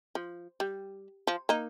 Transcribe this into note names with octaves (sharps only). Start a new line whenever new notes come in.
F3
G3
F3
A#3 D#4